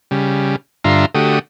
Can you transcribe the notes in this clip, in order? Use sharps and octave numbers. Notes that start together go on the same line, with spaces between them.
C#3 G3
G2 D3 F4 E5 A#5 C6
D3 A3 F#4 G4 D#6